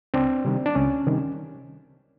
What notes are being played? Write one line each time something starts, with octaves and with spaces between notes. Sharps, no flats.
C#2 C4 D4
C3 D#3 G3
D4
C#2 C#4
C3 D#3 G3